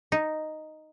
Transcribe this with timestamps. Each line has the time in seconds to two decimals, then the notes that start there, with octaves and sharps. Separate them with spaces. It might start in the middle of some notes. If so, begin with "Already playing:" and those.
0.12 D#4